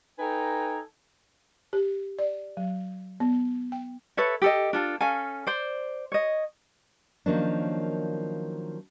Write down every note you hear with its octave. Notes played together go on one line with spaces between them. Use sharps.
D#4 A4 B4 G5 G#5 A#5
G4
D5
F#3
B3
G5
A4 B4 C#5 E5
G4 A4 D#5
D4 F4 A4
C#4 A4 F5 G#5
C5 D5
C#5 D#5
D#3 F3 F#3 A#3 C#4 D4